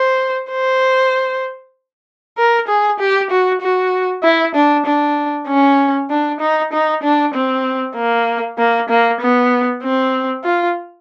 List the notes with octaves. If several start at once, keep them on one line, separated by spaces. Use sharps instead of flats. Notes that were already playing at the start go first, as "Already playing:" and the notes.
Already playing: C5
C5
A#4
G#4
G4
F#4
F#4
E4
D4
D4
C#4
D4
D#4
D#4
D4
C4
A#3
A#3
A#3
B3
C4
F4